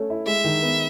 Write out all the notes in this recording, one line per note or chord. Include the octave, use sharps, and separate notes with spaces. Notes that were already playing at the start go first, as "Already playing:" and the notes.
Already playing: A3 C#4
E4
G#3 E5
D#3
B3